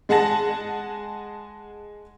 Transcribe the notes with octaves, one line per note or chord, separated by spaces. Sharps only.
G#3 G#4 F#5 A5 A#6